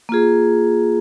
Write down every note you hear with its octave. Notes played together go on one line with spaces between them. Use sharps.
A#3 F4 G#4